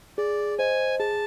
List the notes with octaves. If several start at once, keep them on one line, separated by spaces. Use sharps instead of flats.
G#4 D5
C5 D#5 G#5
G#4 A5